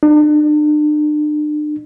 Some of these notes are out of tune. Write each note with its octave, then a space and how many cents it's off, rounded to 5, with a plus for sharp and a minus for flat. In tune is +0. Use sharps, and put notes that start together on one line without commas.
D4 +40